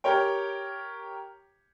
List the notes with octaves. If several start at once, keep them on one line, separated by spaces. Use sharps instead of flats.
G4 A#4 C#5 G5